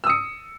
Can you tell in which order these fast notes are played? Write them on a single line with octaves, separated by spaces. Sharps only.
E6 D#6 C#7